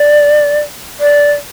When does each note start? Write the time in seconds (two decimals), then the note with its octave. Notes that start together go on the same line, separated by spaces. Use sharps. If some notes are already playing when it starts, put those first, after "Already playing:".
Already playing: D5
1.00 D5